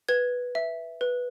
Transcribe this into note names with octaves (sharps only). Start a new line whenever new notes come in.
B4 G#6
E5
B4